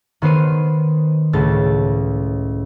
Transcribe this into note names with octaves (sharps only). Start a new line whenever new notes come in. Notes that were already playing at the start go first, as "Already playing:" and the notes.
D#3 B3 C5 C7 D#7
C#2 A2 A3 A6